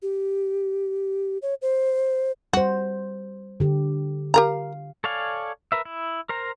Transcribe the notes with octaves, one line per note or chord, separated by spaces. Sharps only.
G4
C#5
C5
G3 F#4 C5
D3 G4
G4 A#4 F5 A#5
A4 C#5 D5 F5 G#5
A#4 B4 E5
E4
A#4 C5 A#5